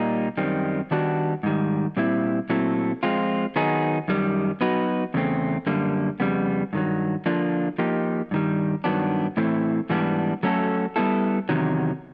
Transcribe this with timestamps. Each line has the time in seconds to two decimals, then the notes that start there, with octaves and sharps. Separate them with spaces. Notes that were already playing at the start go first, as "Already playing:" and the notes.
Already playing: A#2 G3 A#3 D#4
0.37 F#2 D#3 G3 C4
0.91 D#3 G3 B3 D4 F#4
1.43 G#2 D#3 G3
1.97 A#2 G3 C4 E4
2.50 A#2 F#3 A3 C4 E4
3.03 F3 G#3 C4 F4
3.56 D#3 F#3 B3 D#4 G#4
4.08 F#2 D#3 G3
4.61 F#3 B3 D#4 F#4 B4
5.14 E2 C#3 A3 C4
5.66 F#2 D3 G3 A#3
6.20 F2 C#3 G3 B3
6.73 G2 D#3 F#3
7.26 D3 F3 A#3 D4 F4
7.78 F3 A#3 D#4 G4
8.31 G2 D#3 G3
8.84 G2 D#3 F#3 B3 D4
9.37 A2 E3 A3 C4 E4
9.90 G#2 E3 G3 B3 D4
10.43 F#3 A3 C#4 F#4 A4
10.96 G3 B3 E4 A4
11.49 E2 C3 D#3 F#3